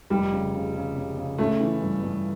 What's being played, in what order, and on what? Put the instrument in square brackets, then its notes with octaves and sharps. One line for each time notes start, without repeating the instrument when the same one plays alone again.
[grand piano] F1 [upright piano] G3
[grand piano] C#3
C#3
C#3
C#3
C#3
[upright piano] A3 [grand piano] C#4
[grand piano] E3
G2
G2